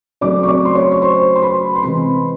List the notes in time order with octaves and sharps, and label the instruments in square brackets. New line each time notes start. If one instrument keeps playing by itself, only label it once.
[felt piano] C#3 F#3 A3 C4 D5 D6
C#6
D5 D6
C6
C#5 C#6
C#6
C5 C6
C6
B4 B5
C6
C3 E3 G#3 C4 B4 B5